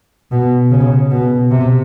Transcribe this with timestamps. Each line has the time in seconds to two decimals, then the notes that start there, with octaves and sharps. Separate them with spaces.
0.32 B2
0.71 C#3
1.11 B2
1.51 C3